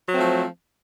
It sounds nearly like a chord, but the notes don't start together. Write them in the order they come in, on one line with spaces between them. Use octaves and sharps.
F#3 C4 A3 F3